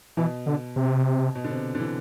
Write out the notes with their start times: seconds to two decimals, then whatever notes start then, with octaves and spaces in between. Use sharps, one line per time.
0.17 B2 E3
0.46 D3
0.76 C3
1.35 B2
1.44 D3
1.50 C3
1.75 D3
1.79 E3